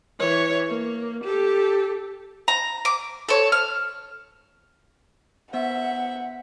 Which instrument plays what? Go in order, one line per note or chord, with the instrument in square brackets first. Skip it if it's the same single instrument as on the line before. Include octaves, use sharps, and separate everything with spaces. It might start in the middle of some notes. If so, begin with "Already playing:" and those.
[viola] E3 C#5
A#3
G4 A4
[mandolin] A#5
D6
A4 C#5
F6
[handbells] B3 C5 [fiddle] E5 [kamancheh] F#5